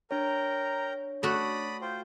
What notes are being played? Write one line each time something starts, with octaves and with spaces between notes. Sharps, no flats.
D4 A#4 C#5 G5 A#5
A3 F#4 D5 B5 D#6
F4 C5 G5